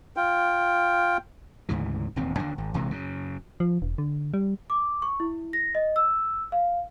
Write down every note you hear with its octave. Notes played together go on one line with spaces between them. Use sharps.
F4 G5
D2 G#2 C#3 E3
E1 D#2 A2 C4
D#2 D3 D4
G#1
A#1 C3 E3 G#3
F#2 C#3
F3
E1
D3
G3
D6
C#6
E4
A#6
D#5
E6
F5